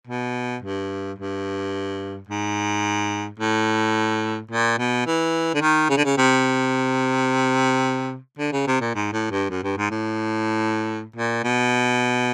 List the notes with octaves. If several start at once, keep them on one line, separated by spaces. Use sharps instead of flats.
B2
G2
G2
G#2
A2
A#2
B2
E3
D3
D#3
C#3
D3
C#3
C3
D3
C#3
C3
A#2
G#2
A2
G2
F#2
G2
G#2
A2
A#2
B2